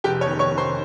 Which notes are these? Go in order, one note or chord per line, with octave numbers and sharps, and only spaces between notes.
F1 G4 G5
C#5 C#6
D#3
C#5 C#6
D#3
C5 C6